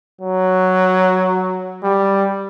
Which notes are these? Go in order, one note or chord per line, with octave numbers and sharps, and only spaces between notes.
F#3
G3